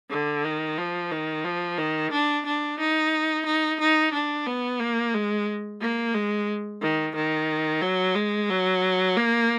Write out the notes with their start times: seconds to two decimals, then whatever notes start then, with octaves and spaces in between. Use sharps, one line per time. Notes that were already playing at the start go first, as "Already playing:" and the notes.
0.10 D3
0.45 D#3
0.78 F3
1.12 D#3
1.45 F3
1.79 D#3
2.12 D4
2.46 D4
2.80 D#4
3.46 D#4
3.80 D#4
4.13 D4
4.47 B3
4.80 A#3
5.14 G#3
5.81 A#3
6.14 G#3
6.82 D#3
7.16 D#3
7.82 F#3
8.15 G#3
8.50 F#3
9.17 A#3